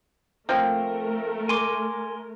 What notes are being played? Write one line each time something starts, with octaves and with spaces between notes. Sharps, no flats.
F3 A3 A#3 C4 A#4
G#5 C6 D6